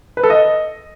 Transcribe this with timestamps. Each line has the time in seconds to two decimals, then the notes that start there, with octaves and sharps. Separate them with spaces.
0.17 B4
0.23 A4
0.30 D#5